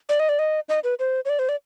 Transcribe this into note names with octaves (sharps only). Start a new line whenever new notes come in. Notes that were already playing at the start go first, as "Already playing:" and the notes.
D5
D#5
D5
D#5
D#5
B4
C5
C#5
D5
C5
D5